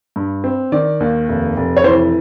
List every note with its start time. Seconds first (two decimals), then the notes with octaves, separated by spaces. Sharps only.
0.16 G2
0.44 C4
0.72 D#3 D5
1.00 D#2
1.29 F1
1.57 F1
1.77 C#5
1.84 E3 C5